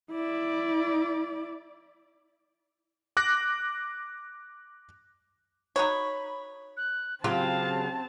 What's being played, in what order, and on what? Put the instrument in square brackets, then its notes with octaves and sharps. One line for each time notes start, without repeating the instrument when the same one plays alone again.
[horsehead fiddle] E4 D5
[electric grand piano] D6 F#6 A#6
[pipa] D#4 F#4 C#5 [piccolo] B5
[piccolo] F#6
[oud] C#3 F#3 G4 [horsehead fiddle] C4 A5 [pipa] F4 [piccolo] F5